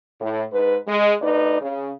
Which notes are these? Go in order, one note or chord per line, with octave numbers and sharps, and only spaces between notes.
A2
G#2 B4
G#3
D2 D#4 B4 D5
C#3